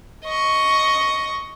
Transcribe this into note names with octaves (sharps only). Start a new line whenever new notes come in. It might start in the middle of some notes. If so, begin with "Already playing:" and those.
D#5 C#6